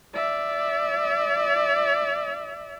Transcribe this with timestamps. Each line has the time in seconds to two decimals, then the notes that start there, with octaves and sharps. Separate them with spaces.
0.14 D5 E5